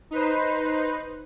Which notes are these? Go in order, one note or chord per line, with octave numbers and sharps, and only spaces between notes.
D#4 B4 C5